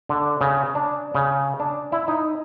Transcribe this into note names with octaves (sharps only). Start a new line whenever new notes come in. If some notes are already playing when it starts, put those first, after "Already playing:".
D3
C#3
D4
C#3
D4
E4
D#4